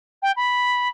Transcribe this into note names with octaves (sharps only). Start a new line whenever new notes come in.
G5
B5